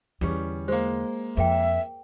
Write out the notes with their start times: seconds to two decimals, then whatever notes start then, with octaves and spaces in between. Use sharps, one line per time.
0.21 E2 D3 G3 C#4
0.68 G#3 A#3 C5
1.37 F2 G#4 A#4 E5 G5